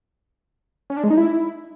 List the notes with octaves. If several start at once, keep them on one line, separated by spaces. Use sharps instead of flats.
C#4
D4
G#3
D#4
E4